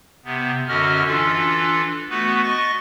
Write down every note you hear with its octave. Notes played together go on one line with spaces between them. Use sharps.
C3 B3
F#2 D3 C#4 F#4 D#5 F6
E3 D4 F4 A4
A3 B3 F#4 B4
D#5 C#6 A6 A#6